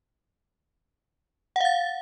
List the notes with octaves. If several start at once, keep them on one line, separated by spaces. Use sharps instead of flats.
F5 F#5 A6